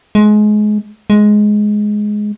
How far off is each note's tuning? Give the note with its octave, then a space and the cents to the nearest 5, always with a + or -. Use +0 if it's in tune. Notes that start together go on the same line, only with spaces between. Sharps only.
G#3 +25
G#3 +10